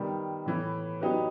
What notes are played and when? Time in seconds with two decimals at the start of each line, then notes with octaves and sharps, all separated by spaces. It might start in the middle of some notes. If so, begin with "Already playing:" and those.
Already playing: D#3 G3 B3
0.46 A2 E3 B3
1.01 F#3 B3 D#4 G4 B4